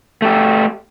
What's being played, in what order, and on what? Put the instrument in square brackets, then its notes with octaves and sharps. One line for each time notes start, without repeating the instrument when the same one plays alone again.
[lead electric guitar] A3 G4